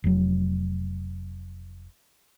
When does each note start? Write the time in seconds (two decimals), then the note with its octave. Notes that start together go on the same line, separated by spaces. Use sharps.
0.04 F1 F#3